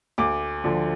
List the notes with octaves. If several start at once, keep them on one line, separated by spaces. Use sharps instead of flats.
D2 D6
D3 F3